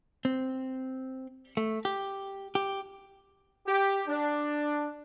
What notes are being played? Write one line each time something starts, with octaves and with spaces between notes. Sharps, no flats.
C4
A3
G4
G4
G4
D4